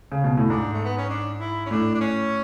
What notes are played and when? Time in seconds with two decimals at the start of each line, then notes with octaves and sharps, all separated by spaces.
0.12 C#3
0.24 B2
0.37 A2
0.49 G#2 D4
0.73 A3
0.85 B3
0.98 C#4
1.10 D4
1.40 E4
1.66 C#4
1.71 A2 D4
1.94 D4
2.01 C#4